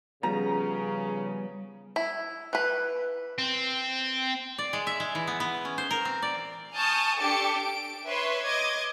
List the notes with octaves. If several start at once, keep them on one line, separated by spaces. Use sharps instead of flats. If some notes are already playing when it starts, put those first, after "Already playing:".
C#3 F3 G3 B3 A#5
E4
E3 B4
C4
D5
G#3
E5
G#3
E3
B3
B3
C#4
C5
A#4
C4
D5
G#5 A5 C#6 D#6 F6 G6
D4 G4 A4 D6 A6 C#7
D7
B4 C#5 E5 C6
D#5 D6 G#6